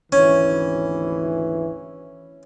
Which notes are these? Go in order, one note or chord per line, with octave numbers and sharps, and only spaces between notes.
G#1 D2 E3 C#4